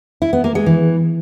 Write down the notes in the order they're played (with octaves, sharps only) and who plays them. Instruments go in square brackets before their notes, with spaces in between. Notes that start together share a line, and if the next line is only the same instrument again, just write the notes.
[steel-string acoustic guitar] E4
B3
A#3
G#3
E3